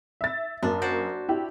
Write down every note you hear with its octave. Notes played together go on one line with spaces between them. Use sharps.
E5 A6
F#2 A#3 D4
F#4 C5 D5
E4 G4